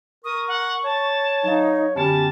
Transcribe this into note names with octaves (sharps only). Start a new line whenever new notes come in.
A#4 C#6 D#6
F#5
C#5 A5
F#3 D#4 F5
F#2 D3 B3 C#4 G4 A5